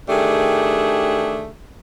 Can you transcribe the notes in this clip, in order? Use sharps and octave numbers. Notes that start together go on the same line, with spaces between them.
D#3 A3 D4 G4 G#4